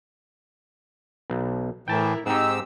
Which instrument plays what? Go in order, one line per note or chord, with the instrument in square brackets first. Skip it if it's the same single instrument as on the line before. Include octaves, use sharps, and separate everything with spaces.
[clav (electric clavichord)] B1
[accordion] A2 E3 [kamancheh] E4 A#4 [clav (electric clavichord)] G5 A5
[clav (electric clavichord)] G#2 D#4 [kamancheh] C4 G4 [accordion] E6